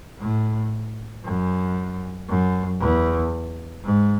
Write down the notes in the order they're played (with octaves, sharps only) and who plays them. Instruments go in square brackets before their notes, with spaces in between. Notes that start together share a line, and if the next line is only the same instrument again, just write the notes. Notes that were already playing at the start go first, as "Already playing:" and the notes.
[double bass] A2
F#2
F#2
E2
G#2